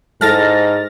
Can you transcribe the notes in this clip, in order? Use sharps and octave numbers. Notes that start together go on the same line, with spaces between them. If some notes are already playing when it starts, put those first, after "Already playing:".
G#2 E4 A4 F6 A6 A#6